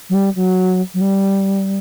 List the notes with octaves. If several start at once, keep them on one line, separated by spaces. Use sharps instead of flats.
F#3
G3
F#3
F#3
G3